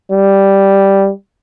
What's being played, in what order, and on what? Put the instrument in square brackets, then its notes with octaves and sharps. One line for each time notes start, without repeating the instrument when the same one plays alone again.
[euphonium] G3